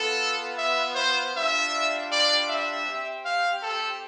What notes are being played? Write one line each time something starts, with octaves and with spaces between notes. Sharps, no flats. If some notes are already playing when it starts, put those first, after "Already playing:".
Already playing: B3 F4 A4
E5
C5
G3 D4 F4 E5
D5
E5
C4 G4
F5
A4